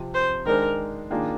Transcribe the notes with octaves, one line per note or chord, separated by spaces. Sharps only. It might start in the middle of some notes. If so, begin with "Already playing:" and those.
Already playing: C3 F3 C4
C5
D#3 G#3 D4 G#4 A#4 C5
D#3 A#3 D4 F4 G#4